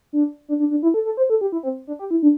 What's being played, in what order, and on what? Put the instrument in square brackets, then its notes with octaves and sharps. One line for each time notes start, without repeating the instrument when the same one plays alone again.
[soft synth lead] D4
D4
D4
D4
E4
A4
A4
C5
A4
G4
E4
C4
D4
G4
E4
D4